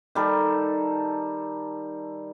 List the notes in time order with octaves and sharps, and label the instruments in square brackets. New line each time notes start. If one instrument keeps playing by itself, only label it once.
[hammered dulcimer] D#3 G3 A4